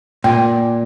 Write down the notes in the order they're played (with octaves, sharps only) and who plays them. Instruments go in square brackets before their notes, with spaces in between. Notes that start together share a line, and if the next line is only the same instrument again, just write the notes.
[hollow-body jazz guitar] A#2 [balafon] G5